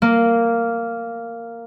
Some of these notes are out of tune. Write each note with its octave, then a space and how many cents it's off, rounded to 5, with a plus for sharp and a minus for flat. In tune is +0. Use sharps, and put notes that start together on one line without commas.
A#3 -10